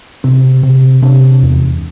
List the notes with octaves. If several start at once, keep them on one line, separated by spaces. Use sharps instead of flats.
C3 C4
C3
C3 D4
E2